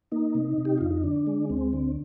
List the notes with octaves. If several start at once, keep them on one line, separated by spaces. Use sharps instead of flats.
A#3 D#4
C3
C3
G4
F2 F4
D#4
D3 D4
G#3
D2 C4
D3